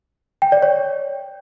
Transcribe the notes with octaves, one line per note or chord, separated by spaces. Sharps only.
G5
D5
C#5